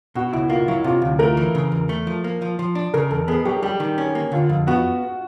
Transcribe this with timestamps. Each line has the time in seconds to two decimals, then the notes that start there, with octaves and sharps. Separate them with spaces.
0.15 B2 F#4
0.32 C#2 E4
0.50 A#3 F4
0.68 F#3 E4
0.84 C3 F4
1.02 D2
1.19 A3 A#4
1.37 E3
1.55 C#3
1.72 E2
1.89 A3
2.07 F3
2.24 A#3
2.42 F3
2.59 F3
2.75 D4
2.94 C#3 A#4
3.11 E2 A4
3.28 B3 G#4
3.45 F#3 G4
3.62 G3 G4
3.80 D#3
3.98 C#4
4.15 A#3
4.32 D3 F4
4.49 F2
4.67 B3 F#4